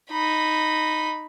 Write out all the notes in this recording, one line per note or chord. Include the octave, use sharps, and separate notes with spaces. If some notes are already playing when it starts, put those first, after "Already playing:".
D#4 B5